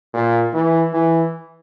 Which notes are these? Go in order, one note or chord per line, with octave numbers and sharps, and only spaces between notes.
A#2
E3
E3